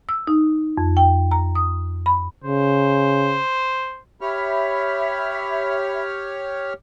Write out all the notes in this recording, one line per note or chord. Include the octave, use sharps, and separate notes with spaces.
E6
D#4
F2
G5
A#5
D#6
B5
C#3 C5
G4 C#5 E5 B5 F6